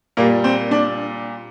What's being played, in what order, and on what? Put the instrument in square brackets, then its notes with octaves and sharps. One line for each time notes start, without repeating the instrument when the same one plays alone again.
[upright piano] A#2 G3 A#3
C4
D4